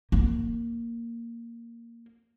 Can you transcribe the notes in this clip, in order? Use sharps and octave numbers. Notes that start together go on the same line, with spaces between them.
A#3